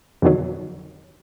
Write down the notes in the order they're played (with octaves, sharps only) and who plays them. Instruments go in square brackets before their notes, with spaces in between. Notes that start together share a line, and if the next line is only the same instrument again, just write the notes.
[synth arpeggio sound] F2 B2 D3 D#3 F#3